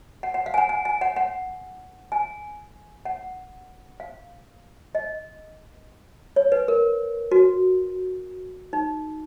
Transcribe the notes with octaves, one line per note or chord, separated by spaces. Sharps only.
F#5
F#5
F5
G#5
F#5
G#5
G#5
F#5
F#5
G#5
F#5
F5
D#5
C#5
B4
A#4
F#4
D#4